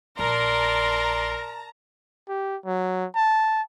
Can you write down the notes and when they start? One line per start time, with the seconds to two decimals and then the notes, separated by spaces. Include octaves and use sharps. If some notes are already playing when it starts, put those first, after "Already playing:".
0.19 A#1 A#4 D5 A5 A#5 C6 A#6
2.29 G4
2.66 F#3
3.15 A5